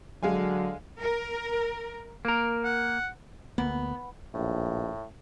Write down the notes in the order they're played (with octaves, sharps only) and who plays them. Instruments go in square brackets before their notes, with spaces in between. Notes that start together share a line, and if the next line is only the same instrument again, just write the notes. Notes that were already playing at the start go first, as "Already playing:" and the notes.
[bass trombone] D3 [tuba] F#3 [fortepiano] G#3 F5 G#5
[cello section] A#4
[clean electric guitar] A#3 A#4
[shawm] F#5
[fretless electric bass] D2 A#3 [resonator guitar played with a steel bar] B3
[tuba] A#1 [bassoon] A2